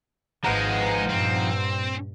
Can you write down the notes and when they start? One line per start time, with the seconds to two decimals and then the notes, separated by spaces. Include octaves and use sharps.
0.44 G#1 F3 G#3 D#4 B4 F#5 A#5
1.09 G2 A#2 C4